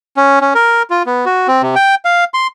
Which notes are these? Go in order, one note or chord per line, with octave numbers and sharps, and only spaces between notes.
C#4
C#4
A#4
F4
B3
F#4
C4
C3
G5
F5
C6